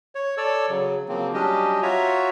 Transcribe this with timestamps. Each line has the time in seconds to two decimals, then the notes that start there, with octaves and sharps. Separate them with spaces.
0.15 C#5
0.38 A4 C#5 D5 E6
0.69 C#3 F#3
1.09 C#3 F3 F#3 A#3 C4
1.34 F#3 G3 C#4 D4 G4 D#5
1.82 F4 F#4 C#5 E5 A#5